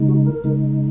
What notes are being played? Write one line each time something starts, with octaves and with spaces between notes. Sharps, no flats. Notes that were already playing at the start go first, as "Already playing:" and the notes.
Already playing: C#3 G#3 D#4
F#4
A#4
C#3 G#3 D#4